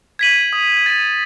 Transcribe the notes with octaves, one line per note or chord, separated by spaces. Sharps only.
G#6 B6 D#7 F#7
D#6
A6 D#7